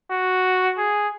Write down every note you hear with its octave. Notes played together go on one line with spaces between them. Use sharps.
F#4
G#4